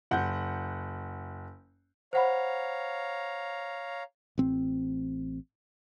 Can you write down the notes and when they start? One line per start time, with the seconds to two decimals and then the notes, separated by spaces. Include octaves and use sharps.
0.11 F#1 F#5 G6
2.13 C5 C#5 F5 F#5 A#5 B5
4.38 A1 C4